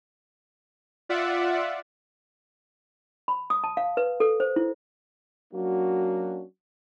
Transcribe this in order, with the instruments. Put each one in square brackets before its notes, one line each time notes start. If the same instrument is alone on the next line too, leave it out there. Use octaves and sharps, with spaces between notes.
[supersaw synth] F4 D5 E5 F#5
[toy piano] B5
D#6
A5
F5
B4
A4
C5
E4
[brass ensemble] F#3 A#3 C#4 D4 F#4